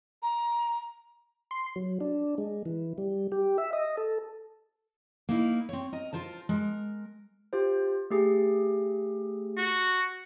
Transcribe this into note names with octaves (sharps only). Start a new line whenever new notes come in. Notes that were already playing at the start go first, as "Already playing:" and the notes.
A#5
C6
F#3
D4
G#3
E3
G3
G4
E5
D#5
A4
A#3 D#4 E4
C4 C#5
A#4 D#5
F4 A#4 C5 A5
G#3 A#4
F4 G4 C5
A3 G4 G#4
F#4